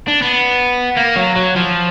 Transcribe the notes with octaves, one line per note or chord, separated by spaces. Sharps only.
D4
B3
A#3
F#3
F#3
F3